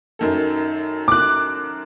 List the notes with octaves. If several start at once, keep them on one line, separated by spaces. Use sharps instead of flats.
F#2 D#3 A4
D6 F#6